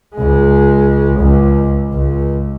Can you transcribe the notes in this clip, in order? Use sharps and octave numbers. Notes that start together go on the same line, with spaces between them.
C#2 G#3
C#2
C#2